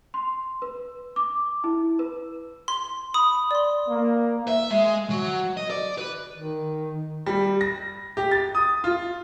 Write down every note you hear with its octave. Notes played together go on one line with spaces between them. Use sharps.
C6
B4
D6
E4
B4
C6
B5 D#6
D5 C6
A#3
E5
G#3
F#3
D#5
D5
B4
D#3
G3
A#6
G4
A6
D#6
F4